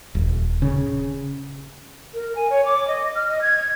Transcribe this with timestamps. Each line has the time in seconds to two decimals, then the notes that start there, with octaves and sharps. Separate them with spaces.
0.15 D#1
0.62 C#3
2.14 A#4
2.36 G#5
2.50 C#5
2.65 D6
2.88 D#5
3.15 F6
3.28 D#5
3.42 G#6